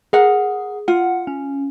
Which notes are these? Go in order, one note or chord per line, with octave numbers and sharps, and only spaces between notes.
G#4 A#4 F#5
F4 F#5
C#4